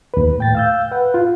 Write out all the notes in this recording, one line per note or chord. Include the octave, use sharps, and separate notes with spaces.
D#2 B4
A2 G5 A6
F5 E6 G6
B4 F#5
F4